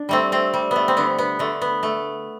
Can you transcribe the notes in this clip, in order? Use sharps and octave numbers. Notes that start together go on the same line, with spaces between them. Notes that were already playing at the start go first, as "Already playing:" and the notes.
Already playing: D4
G3 A3 C4
A3 C4
G3
A3 B3
C4
D3 B3
B3
D3 A3
B3
A3